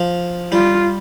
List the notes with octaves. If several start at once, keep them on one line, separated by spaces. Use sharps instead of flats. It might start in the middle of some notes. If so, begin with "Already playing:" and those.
Already playing: F3
G3 F4